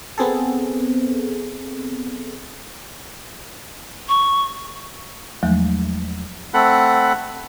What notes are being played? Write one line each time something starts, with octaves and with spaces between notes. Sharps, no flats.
B3 C4 G#4 A4
C#6
E2 F3 F#3 G#3 A3
A3 C4 A4 F#5 B5 F#6